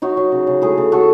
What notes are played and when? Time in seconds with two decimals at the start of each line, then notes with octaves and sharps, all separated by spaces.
0.02 F#3 D#4 F#4
0.17 F#3
0.32 C#3
0.47 C#3
0.62 A3 E4 G#4
0.78 C#3
0.91 A3 F#4 A4